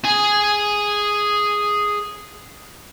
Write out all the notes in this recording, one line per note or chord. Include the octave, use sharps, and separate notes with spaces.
G#4 G#5